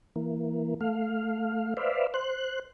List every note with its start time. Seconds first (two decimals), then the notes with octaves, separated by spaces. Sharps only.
0.16 E3 A#3
0.81 A3 F5
1.77 B4 C5 D5 E5 F5
2.14 C5 F#6